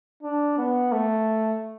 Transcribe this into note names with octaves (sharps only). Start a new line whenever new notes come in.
D4
B3
A3